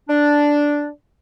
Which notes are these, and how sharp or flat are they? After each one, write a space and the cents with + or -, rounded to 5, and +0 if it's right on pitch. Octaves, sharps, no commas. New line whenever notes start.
D4 -5